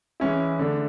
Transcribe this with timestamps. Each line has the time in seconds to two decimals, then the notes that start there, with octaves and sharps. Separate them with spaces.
0.20 E3 G#3 C#4 E4
0.59 D3 A3 D4